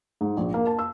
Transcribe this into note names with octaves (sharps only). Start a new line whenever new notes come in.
G#2
A#1
A#3
A5
E6